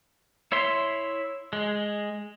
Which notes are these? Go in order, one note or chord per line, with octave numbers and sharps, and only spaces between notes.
E4 C#5 E5 C6
G#3